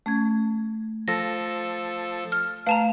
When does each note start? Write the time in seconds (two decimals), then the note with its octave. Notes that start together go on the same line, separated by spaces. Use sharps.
0.06 A3 C#4 G#6
1.08 F3 A4 A#6
2.32 F6
2.67 A3 B4 F5 A5 A#5